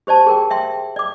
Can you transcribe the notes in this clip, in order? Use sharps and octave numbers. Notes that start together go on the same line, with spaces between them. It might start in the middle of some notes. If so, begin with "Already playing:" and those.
G4 C5 D5 A5
G#4 A#4 G5
E5 G5 C6
D5 D6